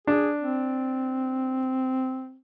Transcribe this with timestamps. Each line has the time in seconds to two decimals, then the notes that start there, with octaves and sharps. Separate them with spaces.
0.07 D4 G#4
0.41 C4